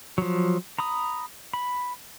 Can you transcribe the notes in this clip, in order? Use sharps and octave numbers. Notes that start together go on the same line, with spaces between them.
F3 F#3
A#5 B5 D#6
B5